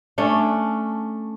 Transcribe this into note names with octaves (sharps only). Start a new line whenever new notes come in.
A3 C#4 D4